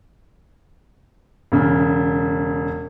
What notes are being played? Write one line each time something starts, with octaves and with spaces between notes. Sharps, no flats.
E1 C#3